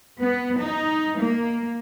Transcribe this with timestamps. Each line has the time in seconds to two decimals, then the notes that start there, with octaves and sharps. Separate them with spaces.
0.21 B3
0.59 D#4
1.19 A#3